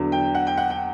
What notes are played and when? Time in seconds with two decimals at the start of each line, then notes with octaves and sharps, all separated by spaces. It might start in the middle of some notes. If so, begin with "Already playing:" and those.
Already playing: E2 D3 F#3
0.12 G5
0.35 F#5
0.47 G5
0.57 F#5
0.70 G5